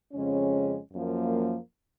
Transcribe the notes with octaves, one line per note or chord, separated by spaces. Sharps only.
F2 C#3 G#3 C#4
F#2 F3 A#3